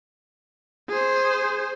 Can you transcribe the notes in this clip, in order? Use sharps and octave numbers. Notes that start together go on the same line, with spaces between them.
G#4 C5